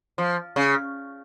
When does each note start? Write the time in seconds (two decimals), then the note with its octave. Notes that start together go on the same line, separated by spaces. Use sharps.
0.18 F3
0.56 C#3